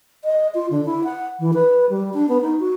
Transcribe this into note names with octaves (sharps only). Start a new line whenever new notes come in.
D#5
F4
D3
E4
F#5
E3
B4
G3
D4
B3
D#4
F#4